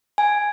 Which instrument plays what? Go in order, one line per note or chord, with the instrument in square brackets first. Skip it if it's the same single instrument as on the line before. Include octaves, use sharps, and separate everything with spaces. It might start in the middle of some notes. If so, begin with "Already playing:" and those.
[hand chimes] G#5